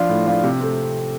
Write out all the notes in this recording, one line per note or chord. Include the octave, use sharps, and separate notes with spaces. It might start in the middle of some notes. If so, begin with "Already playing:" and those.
Already playing: F3 D4 F4
A2
F3 D4 F4
C3
A3 C4